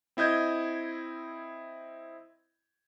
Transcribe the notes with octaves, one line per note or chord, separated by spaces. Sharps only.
C4 E4 D#5 G6 G#6